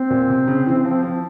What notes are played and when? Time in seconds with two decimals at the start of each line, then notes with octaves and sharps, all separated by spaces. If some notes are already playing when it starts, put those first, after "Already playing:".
Already playing: C4
0.10 A#2
0.30 C3
0.47 C#3
0.66 E3
0.85 F3
1.03 F3